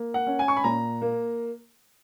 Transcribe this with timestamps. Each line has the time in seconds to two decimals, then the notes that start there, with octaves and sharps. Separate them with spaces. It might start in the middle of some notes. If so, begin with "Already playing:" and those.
Already playing: A#3
0.14 F#5
0.27 C#4
0.39 G#5
0.48 C#6
0.57 B5
0.64 A#2 A#5
1.02 A#3